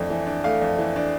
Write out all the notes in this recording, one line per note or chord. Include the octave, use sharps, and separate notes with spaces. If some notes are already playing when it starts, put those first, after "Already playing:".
Already playing: F2 E3 A3 D4
E3
D4
A3 F5
F2
E3
D4